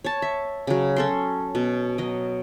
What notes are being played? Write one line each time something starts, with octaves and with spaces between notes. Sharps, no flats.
C#5 A5
E5
C#3 F#3
C#4 A4 C6
B2
F#3 D#5